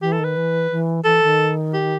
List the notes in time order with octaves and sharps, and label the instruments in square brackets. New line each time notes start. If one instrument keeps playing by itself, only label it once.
[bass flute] E3 [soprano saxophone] G4
[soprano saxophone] A4
[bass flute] D#3
[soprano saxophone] B4
[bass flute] E3
E3
[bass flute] E3 [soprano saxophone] A4
[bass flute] D#3
[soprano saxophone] G4